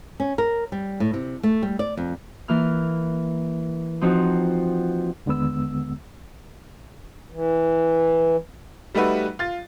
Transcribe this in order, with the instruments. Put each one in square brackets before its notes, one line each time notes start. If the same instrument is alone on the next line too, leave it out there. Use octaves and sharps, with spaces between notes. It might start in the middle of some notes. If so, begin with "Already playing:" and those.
[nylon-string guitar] C#4
A#4
G3
A2
C3
A3
G3
D5
F2
[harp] E3 A#3 F6
F3 C4 D#4 F#4
[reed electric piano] D#2 D3 G#3 B3 E6
[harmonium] E3
[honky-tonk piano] G3 A3 D#4 F#4 B4 E5
F4 A6